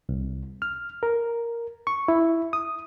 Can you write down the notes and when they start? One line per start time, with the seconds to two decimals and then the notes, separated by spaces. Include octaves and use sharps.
0.09 C2
0.62 F6
1.03 A#4
1.87 C#6
2.08 E4
2.53 D#6